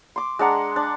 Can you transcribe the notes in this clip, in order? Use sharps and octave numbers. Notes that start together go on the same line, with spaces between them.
C6 D6
G#3 D4 F#5 A#5
D4